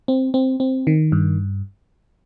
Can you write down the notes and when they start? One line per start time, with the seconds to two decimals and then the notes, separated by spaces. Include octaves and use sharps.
0.08 C4
0.34 C4
0.60 C4
0.87 D#3
1.12 G2